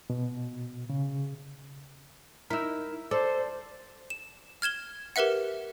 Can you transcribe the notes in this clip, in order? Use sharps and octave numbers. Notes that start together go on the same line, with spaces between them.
B2
C#3
D#4 E4 A#4 E6
A4 C5 D5
E7
F6 G#6 E7 G7
G4 A#4 B4 E5 F#5